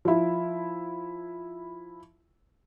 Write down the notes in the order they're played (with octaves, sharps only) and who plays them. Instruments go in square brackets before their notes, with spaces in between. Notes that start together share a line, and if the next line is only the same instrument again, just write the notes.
[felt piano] F3 E4